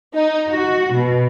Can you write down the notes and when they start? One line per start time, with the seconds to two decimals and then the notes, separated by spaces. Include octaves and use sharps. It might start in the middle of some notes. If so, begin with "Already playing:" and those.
0.15 D#4
0.50 F#4
0.93 B2